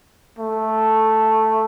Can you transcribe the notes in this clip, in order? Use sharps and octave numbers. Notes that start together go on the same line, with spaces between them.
A3